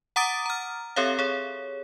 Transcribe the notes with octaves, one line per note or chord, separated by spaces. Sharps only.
F#5 A#5 D6 D#6 A6 D7
A#5 F6
C4 G4 A4 C#5 E5 F5
G#4 C#5